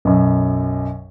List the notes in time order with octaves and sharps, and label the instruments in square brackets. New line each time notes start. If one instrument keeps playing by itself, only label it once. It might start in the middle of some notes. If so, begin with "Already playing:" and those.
[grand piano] B1 F#2